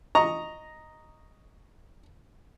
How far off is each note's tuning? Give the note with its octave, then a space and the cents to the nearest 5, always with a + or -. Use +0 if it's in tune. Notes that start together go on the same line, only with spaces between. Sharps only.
D#5 +0 A#5 +0 C#6 +0